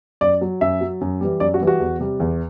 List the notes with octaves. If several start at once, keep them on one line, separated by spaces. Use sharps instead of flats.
F#2 D5
F#3
F#2 E5
F#3
F#2
E3 G3
F#2 D5
F#4
E3 G3
F#4
E2
C3 G3
E2